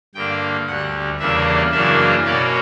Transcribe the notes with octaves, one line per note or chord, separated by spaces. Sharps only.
G2 D3 A#3 D4 G5
D2 D3 G3 F#5
E2 C#3 G3 A#3 D4 E5
F#2 C#3 E3 A#3 D4 E5
B2 A#3 C#4 D5